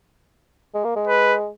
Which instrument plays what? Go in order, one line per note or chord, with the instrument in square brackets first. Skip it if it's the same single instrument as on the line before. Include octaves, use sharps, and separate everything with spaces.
[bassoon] G#3
A#3
G#3
[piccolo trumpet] B4